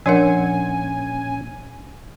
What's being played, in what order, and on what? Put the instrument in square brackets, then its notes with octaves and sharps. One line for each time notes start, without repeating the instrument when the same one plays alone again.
[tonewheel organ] A#2 C#4 [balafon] F3 D4 A#4 [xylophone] C#5 F#5 [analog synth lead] G#5